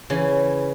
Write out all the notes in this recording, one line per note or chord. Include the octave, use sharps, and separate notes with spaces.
C#3 E3